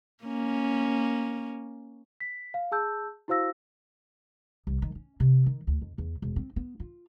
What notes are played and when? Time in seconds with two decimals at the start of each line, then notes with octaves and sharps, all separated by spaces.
0.24 A#3 C#4
2.20 B6
2.54 F5
2.72 G#4 A5 E6 G6
3.28 E4 F#4 C5 F5 E6 A#6
4.67 C2
4.82 D#3
4.95 C#4
5.20 C3
5.46 D#3
5.67 D2
5.81 F2
5.98 E2
6.22 E1
6.36 C4
6.56 B3
6.80 F4